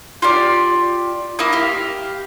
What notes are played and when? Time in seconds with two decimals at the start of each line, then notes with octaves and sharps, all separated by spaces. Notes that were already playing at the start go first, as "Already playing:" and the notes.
0.22 F4 G4 D5
1.39 A#3 E4 D#6
1.53 G4 F5